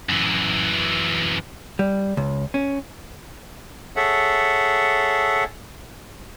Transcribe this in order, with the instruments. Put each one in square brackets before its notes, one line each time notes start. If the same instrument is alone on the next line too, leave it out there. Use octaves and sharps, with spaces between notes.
[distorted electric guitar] F#2 E3
[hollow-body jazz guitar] G3
C#2
C#4
[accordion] G#4 A4 C#5 E5 F#5